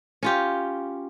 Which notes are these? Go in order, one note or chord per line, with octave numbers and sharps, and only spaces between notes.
C#4 F4 G4